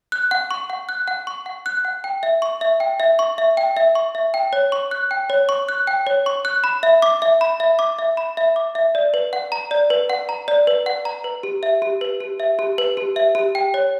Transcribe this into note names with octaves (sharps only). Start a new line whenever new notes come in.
F#6
F#5
C#6
F#5
F#6
F#5
C#6
F#5
F#6
F#5
G5
E5
C#6
E5
G5
E5
C#6
E5
G5
E5
C#6
E5
G5
C#5
C#6
F#6
G5
C#5
C#6
F#6
G5
C#5
C#6
F#6
B5
E5
D6
E5
B5
E5
D6
E5
B5
E5
D6
E5
D5
B4
F#5
A#5
D5
B4
F#5
A#5
D5
B4
F#5
A#5
B4
G4
E5
G4
B4
G4
E5
G4
B4
G4
E5
G4
G5
C#5